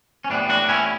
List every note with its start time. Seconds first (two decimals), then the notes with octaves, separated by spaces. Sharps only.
0.24 C#4
0.30 A2 G3 B3 D4
0.49 D4 F#4
0.69 C#4 E4